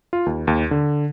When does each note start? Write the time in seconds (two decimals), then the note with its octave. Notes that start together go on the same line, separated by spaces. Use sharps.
0.13 F4
0.26 D#2
0.47 D#2
0.71 D3